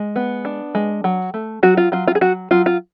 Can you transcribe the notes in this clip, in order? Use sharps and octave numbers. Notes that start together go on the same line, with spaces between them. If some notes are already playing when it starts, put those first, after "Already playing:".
Already playing: G#3
B3
D4
G#3
F#3
A3
F#3 F#4
F4
F#3 F4
F4
G#4
F#3 F#4
F#3 F4
F4